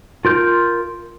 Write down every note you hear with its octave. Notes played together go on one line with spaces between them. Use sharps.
F4 A#4 G6